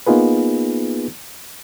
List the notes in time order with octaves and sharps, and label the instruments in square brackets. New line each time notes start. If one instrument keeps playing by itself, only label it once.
[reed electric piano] A#3 B3 D#4 F4 G#4 B4